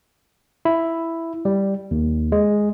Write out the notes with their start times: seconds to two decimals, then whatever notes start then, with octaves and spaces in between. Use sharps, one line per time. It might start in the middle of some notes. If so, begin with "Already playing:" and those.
0.65 E4
1.45 G3
1.91 D#2
2.32 G#3